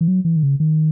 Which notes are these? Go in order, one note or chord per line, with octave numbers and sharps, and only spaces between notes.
E3
F#3
E3
D#3
C#3
D#3